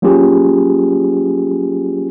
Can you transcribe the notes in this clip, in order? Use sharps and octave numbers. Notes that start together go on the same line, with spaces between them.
F#3 A#3 C#4 F4 G4 G#4